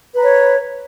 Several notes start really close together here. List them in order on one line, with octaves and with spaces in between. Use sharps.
B4 A#5 C#5